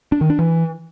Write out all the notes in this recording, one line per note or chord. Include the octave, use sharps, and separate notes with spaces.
D4
D#3
D4
E3